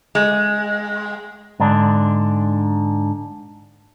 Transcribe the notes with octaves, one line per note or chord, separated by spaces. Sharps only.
G#3
G#2 D3 D4